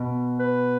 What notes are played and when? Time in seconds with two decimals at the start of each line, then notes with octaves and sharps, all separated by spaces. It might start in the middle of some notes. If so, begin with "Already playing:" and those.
Already playing: B2
0.39 B4